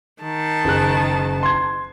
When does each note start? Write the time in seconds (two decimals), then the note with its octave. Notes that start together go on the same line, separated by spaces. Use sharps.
0.23 D#3 A5
0.64 F#1 G#4 F#6
1.43 C6 G#6